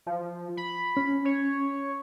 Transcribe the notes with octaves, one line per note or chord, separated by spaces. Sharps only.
F3
B5
C#4
C#5